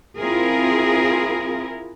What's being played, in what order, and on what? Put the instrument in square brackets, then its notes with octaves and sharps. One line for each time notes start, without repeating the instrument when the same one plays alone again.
[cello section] C4 E4 F4 G#4 A#4